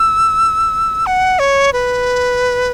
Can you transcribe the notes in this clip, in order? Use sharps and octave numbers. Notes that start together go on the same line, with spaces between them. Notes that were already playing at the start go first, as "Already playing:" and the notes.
Already playing: E6
F#5
C#5
B4